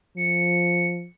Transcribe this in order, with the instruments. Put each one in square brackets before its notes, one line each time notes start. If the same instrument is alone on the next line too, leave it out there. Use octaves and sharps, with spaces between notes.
[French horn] F3 [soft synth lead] C#7